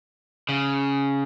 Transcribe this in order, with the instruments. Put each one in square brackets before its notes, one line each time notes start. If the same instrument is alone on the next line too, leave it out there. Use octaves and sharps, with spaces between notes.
[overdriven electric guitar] C#3